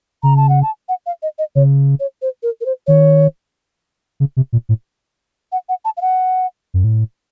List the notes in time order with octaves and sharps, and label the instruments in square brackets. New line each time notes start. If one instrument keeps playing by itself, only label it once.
[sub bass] C#3 [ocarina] A#5
[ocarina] A5
F#5
A5
F#5
F5
D#5
D#5
[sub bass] C#3 [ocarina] C#5
[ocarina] C#5
C5
A#4
A#4
C5
[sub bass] D#3 [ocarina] C#5
[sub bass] C#3
C3
A#2
A2
[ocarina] F#5
F#5
A5
F5
F#5
[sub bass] F#2
A2